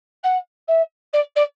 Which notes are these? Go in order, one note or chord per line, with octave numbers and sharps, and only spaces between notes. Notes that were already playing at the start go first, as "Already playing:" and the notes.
F#5
E5
D5
D5